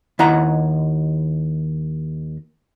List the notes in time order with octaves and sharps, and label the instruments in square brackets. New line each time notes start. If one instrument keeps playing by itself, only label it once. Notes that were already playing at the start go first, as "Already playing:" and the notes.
[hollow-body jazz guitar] D#2 E4 D#5 F#5 A#5